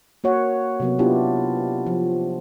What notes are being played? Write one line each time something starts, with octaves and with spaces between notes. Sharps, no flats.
A#3 F#4 C#5 F#5
C3 F#3 B3
B3 D4 E4 F4 G4
F3